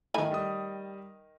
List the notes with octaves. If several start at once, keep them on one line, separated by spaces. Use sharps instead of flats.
D#3 A3 D#4 G#5 B5
G3 D#5 D#6